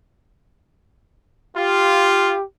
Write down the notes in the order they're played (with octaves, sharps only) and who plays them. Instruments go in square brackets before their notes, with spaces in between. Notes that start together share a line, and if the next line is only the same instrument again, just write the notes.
[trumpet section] F4 [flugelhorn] G4